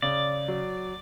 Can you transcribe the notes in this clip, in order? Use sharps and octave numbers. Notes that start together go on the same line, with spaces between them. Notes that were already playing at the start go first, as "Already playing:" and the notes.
C#3 D5
F#3